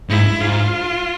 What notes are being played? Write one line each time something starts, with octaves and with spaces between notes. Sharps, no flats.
G#2 E4
G#2 F4